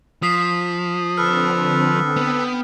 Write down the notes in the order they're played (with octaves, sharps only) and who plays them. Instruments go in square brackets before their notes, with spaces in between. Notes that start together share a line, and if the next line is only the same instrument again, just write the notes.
[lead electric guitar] F3 [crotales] D#6 B6 C7
[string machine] D3 C4 [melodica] A4 B4 [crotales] F6
[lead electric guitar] B3 [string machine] G5